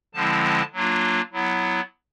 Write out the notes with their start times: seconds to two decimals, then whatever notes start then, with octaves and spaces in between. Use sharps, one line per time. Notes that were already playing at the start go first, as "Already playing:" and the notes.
0.14 D3 F3 G#3 C4 E4 A5
0.44 A5
0.73 F#3 A#3 D4 F4
1.33 F#3 B3 E4